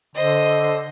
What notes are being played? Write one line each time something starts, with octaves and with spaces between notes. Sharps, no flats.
D3 C5 D#5